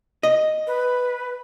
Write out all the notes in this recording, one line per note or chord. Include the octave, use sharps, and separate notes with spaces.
D#5
B4